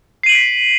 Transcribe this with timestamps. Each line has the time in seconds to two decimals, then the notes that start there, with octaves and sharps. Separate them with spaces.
0.23 C7
0.26 D#7
0.29 F#7
0.32 D7
0.35 B6